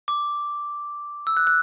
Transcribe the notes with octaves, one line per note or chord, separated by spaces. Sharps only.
D6
E6
F#6
F#6